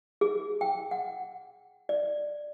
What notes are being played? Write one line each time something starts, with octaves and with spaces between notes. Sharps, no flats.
G#4
G5
F#5
D5